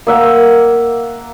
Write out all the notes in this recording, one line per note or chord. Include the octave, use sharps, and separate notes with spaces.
A#3 E5 F#5